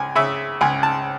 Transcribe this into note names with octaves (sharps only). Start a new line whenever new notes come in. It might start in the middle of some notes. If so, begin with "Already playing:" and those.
Already playing: C#2 G#5
C#3 E5
C#2 G#5
A5